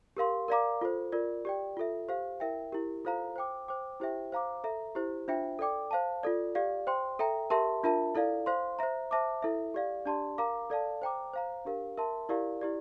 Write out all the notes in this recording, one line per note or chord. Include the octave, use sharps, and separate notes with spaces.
G4 A#4 F5 C6
A#4 D5 F5 A#5 D6
F4 A4 C5
F4 A#4 D5
G4 D5 G5
F4 A4 E5
G4 C5 F5
E4 A#4 E5 G5
E4 G4 A#4
F4 A4 C5 F5 A#5
C5 G5 D6
C5 G5 D6
E4 G4 C5 E5 G5
C5 F5 A#5 D6
A4 E5 A#5
E4 G4 C5
D4 F4 C5 E5 G5
A4 D5 G5 D6
C5 F5 A5
F4 A4 D5
G4 D5 F5
C5 G5 C6
A4 E5 G5 A#5
G4 A#4 E5 A5 C6
D4 F4 A#4 E5 A5
E4 A4 D5 F5
C5 F5 C6
C5 E5 A#5
C5 E5 A5 D6
E4 A4 E5
G4 D5 F5
D4 G4 D5 A5 C6
A#4 F5 A#5 D6
A4 D5 F5 A5
C5 G5 A#5 D6
C5 F5 A#5
D4 G4 A#4 F5
A#4 E5 A5 C6
E4 G4 A#4 D5 F5
E4 G4 D5